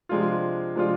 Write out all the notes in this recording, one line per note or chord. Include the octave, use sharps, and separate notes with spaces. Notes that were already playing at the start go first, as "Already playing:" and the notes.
C3 F3 G#3 D4 F4
C3 F3 G#3 D4 F4